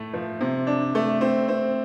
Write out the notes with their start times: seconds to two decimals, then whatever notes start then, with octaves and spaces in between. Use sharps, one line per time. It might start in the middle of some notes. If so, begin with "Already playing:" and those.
Already playing: A2 A3
0.14 F3
0.41 C3
0.67 D4
0.95 A3
1.21 C4
1.48 C4